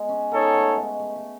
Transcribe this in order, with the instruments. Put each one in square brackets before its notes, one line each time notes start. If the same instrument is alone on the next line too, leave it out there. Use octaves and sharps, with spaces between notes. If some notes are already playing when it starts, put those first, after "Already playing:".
Already playing: [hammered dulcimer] G#3 B3
C#4
[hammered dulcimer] B3 [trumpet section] D#4 A4 C#5
[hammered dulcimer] A3
G#3
A3
A3